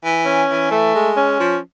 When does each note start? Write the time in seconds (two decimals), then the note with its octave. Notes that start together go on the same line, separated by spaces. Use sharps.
0.03 E3
0.25 C#4
0.48 E3
0.70 A3
0.94 G#3
1.17 C#4
1.39 F3